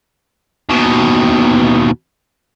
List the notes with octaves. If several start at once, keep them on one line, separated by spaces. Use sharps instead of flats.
D#2 B2